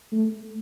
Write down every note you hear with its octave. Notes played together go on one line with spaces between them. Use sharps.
A3